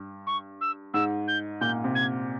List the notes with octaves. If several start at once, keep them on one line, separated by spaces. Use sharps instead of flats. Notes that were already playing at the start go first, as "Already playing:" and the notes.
Already playing: G2
C#6
E6
G#2 E6
G6
A#2 G6
C3
G#6